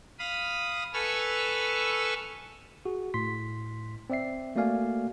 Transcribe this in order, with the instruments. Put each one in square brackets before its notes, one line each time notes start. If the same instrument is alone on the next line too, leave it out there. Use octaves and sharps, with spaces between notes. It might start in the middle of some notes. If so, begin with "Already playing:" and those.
[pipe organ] F5 B5 D#6
A4 B4 G#5 C#6 E6 F6
[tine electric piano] F#4 G#4
A2 C6 B6
C4 D5 E5 C7
A3 A#3 F#4 D5 F5 G#5